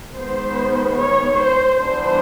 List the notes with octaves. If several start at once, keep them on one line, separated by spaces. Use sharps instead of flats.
D#3 G#3 B3 C5
C#5
C5
E3 G3 B3 D4 C5